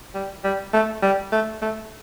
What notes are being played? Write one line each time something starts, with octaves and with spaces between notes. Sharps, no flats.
G3
G3
A3
G3
A3
A3